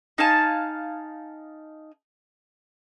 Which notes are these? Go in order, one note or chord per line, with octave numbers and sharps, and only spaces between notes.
D#4 F5 G#5 A5